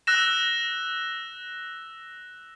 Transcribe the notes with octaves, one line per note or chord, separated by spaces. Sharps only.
E6 F#6 A#6 E7